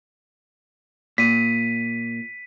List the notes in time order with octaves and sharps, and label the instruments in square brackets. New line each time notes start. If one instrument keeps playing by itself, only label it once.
[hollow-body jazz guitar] A#2 [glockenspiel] B6 D#7